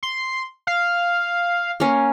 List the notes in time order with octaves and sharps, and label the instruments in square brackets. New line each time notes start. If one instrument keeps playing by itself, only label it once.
[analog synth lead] C6
F5
[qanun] A#3 C#4